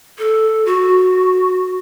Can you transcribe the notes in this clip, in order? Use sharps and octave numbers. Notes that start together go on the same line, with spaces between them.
A4
F#4